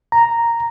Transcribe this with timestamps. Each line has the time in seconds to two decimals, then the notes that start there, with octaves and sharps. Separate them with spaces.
0.12 A#5